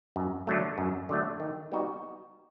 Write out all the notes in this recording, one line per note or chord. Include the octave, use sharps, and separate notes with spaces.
F#2
D3 F#3 A3
F#2
D3 F#3 A3
D#3
G3 B3 D#4 F#4